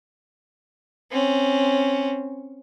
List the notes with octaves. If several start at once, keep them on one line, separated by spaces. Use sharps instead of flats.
C4 C#4